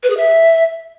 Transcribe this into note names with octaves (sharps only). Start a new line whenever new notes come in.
B4
G#4
E5